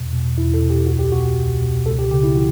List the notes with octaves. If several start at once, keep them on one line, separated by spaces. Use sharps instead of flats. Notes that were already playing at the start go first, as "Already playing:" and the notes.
Already playing: E2 B2
B2
E2 E4
A4
B2
G4
C#2 F#4
G4
B2 F#4
C#2
B2
C#2 A4
G4
C#3 G4
E4
E3 F#4